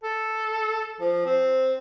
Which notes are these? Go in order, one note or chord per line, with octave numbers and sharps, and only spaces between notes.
A4
F3
C4